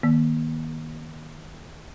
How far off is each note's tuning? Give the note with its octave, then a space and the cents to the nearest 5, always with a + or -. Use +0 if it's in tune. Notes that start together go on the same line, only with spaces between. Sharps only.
D#3 +0 A#3 +30